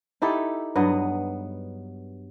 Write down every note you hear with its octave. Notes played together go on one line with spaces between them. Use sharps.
D#4 E4 G4 A4
G2 F#3 B3 D#5